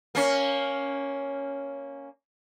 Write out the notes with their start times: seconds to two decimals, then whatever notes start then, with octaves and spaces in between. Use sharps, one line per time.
0.15 A#3 C#4